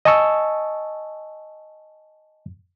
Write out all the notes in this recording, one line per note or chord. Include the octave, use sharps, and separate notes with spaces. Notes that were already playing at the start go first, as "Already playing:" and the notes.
D#5 G#5 A5 C#6 E6